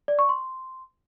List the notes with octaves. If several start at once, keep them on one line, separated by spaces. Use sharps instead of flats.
D5
C#6
C6